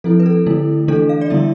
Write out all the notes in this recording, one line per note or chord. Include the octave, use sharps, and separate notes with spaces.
F3 C4 E4 A4
B4
A4
D3 A3 E4
E3 A3 D4 A4
F5
D5
D3 G3 B3 E4 E5